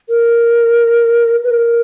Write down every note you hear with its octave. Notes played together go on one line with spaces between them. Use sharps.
A#4
B4
A#4